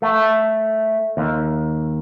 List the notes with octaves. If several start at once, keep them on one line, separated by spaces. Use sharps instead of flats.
A3
D#2